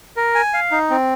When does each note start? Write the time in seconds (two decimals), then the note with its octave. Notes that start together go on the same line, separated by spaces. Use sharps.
0.17 A#4
0.35 G#5
0.54 F5
0.71 D#4
0.90 C4